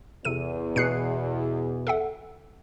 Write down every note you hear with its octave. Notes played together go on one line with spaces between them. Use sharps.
E2 C3 A4 D#7
B2 G#4 F#6 C7 C#7
A4 E5 F#5